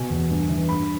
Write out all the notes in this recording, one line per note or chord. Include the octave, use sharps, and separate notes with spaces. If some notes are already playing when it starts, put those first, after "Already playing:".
Already playing: B2 G#5
E2
G2
E3
G2 B5